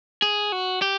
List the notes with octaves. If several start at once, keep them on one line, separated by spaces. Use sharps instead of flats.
G#4
F#4
G4